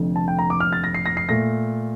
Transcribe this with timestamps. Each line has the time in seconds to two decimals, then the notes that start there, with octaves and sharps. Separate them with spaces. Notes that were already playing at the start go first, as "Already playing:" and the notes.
Already playing: F1 F2 D3
0.16 A5
0.28 G5
0.39 A#5
0.50 D6
0.60 F6
0.72 A6
0.84 A#6
0.94 C7
1.06 A#6
1.17 C7
1.29 A#2 A3 A#6